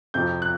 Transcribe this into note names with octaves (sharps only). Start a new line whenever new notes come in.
F2 C3 F3 G6
F#6